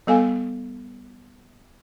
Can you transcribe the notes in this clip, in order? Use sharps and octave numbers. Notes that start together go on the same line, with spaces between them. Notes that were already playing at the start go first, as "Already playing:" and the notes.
G3 B3 A4 F5 G#5